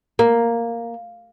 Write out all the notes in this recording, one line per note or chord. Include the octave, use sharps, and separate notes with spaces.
A#3